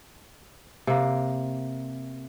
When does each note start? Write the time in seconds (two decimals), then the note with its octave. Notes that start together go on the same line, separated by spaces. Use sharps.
0.87 C3 A#3